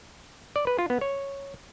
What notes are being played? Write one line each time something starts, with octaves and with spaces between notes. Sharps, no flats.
D5
B4
F4
B3
C#5